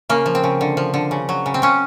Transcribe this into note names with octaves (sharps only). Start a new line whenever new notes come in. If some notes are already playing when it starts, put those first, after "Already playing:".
C#3 A#3
F3
C4
C#3
D3
F3
D3
C#3
F#3
C#3
C4
C#3 C#4